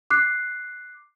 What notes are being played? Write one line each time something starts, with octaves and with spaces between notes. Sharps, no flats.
D6 F#6 C7